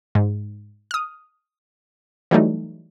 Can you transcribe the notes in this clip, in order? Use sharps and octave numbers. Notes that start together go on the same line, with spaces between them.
G#2
D#6 F6
E3 F#3 G3 A3 D#4